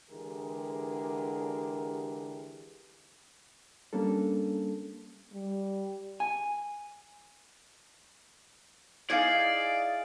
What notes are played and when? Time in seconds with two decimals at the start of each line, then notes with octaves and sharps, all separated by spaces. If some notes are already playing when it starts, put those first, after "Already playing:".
0.10 D3 E3 G#3 G4 G#4 A#4
3.93 G3 A#3 C#4 D4 A4
5.33 G3
6.20 G#5
9.10 D#4 E4 G#4 D5 D#5 F5 G#6 C7